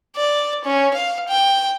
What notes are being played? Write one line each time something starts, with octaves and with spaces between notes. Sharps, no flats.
D5
C#4
F5
G5